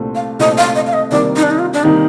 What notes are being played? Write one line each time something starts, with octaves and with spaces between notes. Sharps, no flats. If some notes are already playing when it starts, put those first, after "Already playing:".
Already playing: C2 A#2 A3 C4
F5
C2 A#2 A3 C4 D#5
F5
D#5
F5
D#5
C3 D#3 G3 A#3 D5
D#4
D4
D#4
F4
D4
C3 D#3 G3 A#3 D#4